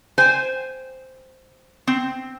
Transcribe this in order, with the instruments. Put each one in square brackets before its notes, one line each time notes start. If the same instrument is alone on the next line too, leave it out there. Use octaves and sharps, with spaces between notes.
[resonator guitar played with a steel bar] C5 G5 G#5
C4